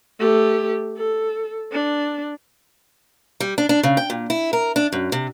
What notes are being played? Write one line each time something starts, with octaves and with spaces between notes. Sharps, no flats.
A3 G4
A4
D4
G3
D4
D4
C#3
G5
A#2
E4
A#4
D4
F#2
C3